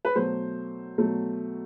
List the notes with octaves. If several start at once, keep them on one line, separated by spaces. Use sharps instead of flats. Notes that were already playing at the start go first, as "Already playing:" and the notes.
B4
B2 F#3 A3 C5
B2 F#3 A3